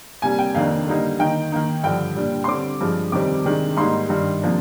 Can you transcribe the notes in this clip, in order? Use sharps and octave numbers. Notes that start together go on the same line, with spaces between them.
C3 G3 A#3 G#5
G5
F2 C3 D#3 A#3 D4 F5
D3 G3 A#3 D#4
D#3 A#3 D#4 G5
D#3 A#3 D#4
G2 D3 F3 G5
A#2 G3 D4
C6
D3 G3 C4 D6
G2 F3 G#3
F2 C3 D#3 G3 C4 D6
C3 D#3 G#3 D4
G#2 G3 A#3 D#4 C6
G2 D#3 G3
C3 F3 A#3 D4